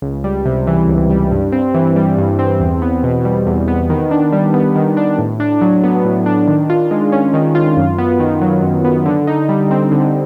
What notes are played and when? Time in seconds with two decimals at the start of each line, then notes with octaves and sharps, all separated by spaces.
0.02 C#2
0.24 G3
0.46 C3
0.67 E3
0.88 C#2
1.10 G3
1.31 G2
1.52 C4
1.74 E3
1.96 G3
2.18 G2
2.39 C4
2.60 E2
2.82 B3
3.04 B2
3.25 G3
3.47 E2
3.68 B3
3.90 D#3
4.11 D4
4.33 G3
4.54 B3
4.76 D#3
4.97 D4
5.19 A2
5.40 D4
5.61 F#3
5.84 B3
6.05 A2
6.26 D4
6.48 D#3
6.70 F4
6.91 G#3
7.12 C#4
7.34 D#3
7.55 F4
7.77 F#2
7.98 B3
8.20 D#3
8.41 F#3
8.63 F#2
8.84 B3
9.06 D3
9.27 D#4
9.49 G3
9.71 C4
9.92 D3